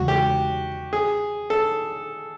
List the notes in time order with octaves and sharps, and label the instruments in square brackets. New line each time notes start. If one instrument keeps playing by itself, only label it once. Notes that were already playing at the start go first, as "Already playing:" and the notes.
Already playing: [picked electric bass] E2 C#3 E3 G#3 [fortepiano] F#4
[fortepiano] G4
G#4
A4